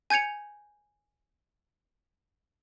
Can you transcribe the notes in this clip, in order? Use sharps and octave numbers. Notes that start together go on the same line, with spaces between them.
G#5 G6 G#6 C#7 F7